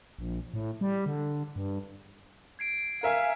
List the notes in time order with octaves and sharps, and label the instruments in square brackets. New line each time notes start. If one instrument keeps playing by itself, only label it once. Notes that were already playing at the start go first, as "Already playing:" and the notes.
[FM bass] A#1
A2
G3
D3
G2
[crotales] G#6 C7 D7
[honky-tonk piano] A#4 E5 G#5 [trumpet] F5 [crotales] D#7